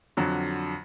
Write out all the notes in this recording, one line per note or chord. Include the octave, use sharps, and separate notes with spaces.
F2 D3 F#3